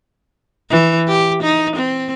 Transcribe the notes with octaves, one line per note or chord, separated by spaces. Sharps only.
E3
G4
D#4
C4